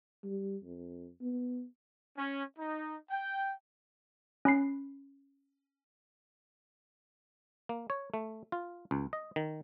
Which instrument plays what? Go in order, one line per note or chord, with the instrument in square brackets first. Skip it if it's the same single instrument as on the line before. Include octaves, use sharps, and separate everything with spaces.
[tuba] G3
F2
B3
[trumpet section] C#4
D#4
G5
[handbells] C#4 B5 C7
[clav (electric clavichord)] A#3
C#5
A3
F4
C#2
D#5
D#3